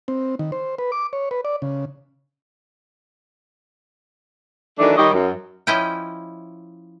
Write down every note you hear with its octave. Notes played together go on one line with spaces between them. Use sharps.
C4
D#3
C5
B4
D6
C#5
B4
D5
C#3
D#3 E3 F#3 A3 D4
D#3 G3 D#4 G4 C#5 D#5
F#2
F3 C#4 E4 D#5 G5